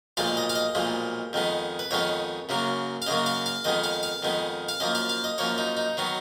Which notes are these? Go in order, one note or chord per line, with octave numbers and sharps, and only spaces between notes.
B1 A#2 F3 G#3 F5
D#5
F5
D#5
B1 A#2 F3 G#3
F2 D#3 G#3 B3
B4
F2 D#3 G#3 B3 C#5
F#2 C#3 F#3 A#3
F5
F#2 C#3 F#3 A#3 D#5
F5
F5
F2 D#3 G#3 B3 D#5
F5
F5
F2 D#3 G#3 B3
F5
F#2 F3 A#3 D#5
F5
F5
D#5
F#2 F3 A#3 C#5
D#4
D#4
D#3 F#3 B3